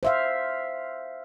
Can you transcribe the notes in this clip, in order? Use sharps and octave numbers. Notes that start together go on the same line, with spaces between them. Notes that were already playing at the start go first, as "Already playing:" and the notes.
C5 E5 F5